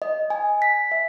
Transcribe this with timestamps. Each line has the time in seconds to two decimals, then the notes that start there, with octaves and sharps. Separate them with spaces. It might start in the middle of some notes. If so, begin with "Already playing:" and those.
0.02 D#5
0.30 G#5
0.62 B6
0.92 E5